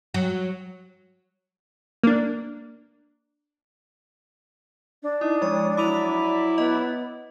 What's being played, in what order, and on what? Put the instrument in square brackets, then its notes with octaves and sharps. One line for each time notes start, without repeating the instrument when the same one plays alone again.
[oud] F#3
[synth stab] A#3 D4
[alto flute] D4
[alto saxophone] D#4 [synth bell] E4 [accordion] D#6
[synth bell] F3 G#3 [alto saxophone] C#5
[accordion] F#3 B5 D6 [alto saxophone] E4 [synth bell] D#6 D#7 F7
[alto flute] D5
[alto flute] B3 [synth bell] D#5